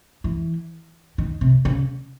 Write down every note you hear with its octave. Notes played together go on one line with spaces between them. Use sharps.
E3
D#3
C3
C#3